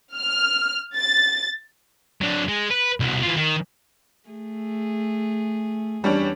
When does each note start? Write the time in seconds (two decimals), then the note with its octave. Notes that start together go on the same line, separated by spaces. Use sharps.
0.15 F6
0.96 A6
2.21 F#3 D4
2.48 G#3
2.70 B4
3.00 C2 B2
3.23 E3 F4
3.37 D#3
4.29 A3 G#4
6.04 E2 G3 C#4 D4